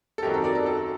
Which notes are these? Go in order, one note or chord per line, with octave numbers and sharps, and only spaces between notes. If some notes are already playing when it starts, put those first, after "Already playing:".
A4
F#2 D#3 F#3 C4 D#4 G4 A#4
A4
A#4 D5
A4
A4